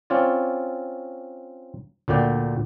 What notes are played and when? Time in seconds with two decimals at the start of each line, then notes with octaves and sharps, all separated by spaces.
0.10 C4 C#4 F4 C#5 D5
2.08 D2 A#2 D3 D5 G5